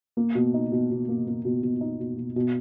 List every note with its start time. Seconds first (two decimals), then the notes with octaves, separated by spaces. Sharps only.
0.17 A#3
0.35 B2
0.54 D#4
0.72 B2
0.91 B2
1.08 A#3
1.27 A#3
1.45 B2
1.63 B2
1.81 D#4
1.99 B2
2.17 B2
2.36 B2